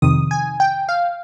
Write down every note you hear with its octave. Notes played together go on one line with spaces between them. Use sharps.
F2 C3 D#3 D#6
G#5
G5
F5